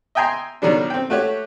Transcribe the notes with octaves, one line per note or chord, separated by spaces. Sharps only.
D#5 E5 G5 G#5 A#5 C6
B2 D#3 F#3 G3 D4
C4 G5
A3 F#4 G4 C#5